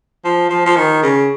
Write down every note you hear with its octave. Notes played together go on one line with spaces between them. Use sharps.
F3
F3
F3
D#3
C#3